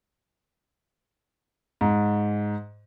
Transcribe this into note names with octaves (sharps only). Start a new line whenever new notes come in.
G#2